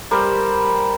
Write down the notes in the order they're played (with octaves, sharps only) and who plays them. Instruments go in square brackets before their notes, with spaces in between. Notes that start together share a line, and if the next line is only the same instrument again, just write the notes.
[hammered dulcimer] G3 A#4 C5